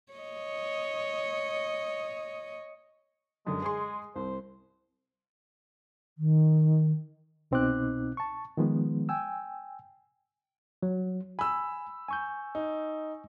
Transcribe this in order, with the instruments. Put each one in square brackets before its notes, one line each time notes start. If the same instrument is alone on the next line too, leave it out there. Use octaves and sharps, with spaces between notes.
[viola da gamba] C#5 D#5
[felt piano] F#2 D3 [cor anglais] G#3
[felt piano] G#4 G#5 C6
[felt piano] C2 [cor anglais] C5
[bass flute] D#3
[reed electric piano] C2 B2 C4 D#4 D6 F#6
A5 C#6
D#3 F3 G#3 B3
G5 G#5 E6
[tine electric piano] F#3
[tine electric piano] G#5 [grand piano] B5 E6
[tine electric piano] G#5 C#6 G6
[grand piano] D#4